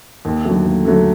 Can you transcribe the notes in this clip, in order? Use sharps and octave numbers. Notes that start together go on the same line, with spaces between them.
D#2
D3 F#3 A3
D#2
D3 F#3 A3